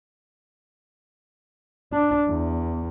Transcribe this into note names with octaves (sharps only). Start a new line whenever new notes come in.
D4
E2